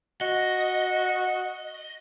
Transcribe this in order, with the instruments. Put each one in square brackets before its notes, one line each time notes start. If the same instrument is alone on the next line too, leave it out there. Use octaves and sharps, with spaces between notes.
[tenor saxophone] F#4 [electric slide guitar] D#5